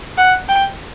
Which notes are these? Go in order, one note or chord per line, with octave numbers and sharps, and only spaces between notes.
F#5
G5